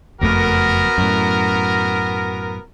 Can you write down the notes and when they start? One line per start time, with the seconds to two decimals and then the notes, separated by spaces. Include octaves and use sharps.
0.21 F#1 F2 A3 B3 F#4 A#4
0.98 F#2 A2